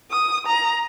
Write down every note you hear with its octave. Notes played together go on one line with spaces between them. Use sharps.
D#6
A#5